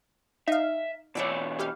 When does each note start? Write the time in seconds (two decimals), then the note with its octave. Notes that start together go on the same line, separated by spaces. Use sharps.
0.48 D#4 E5 F5
1.15 B2 E3 C#5 D5 E5 G5
1.59 E4 G4 F5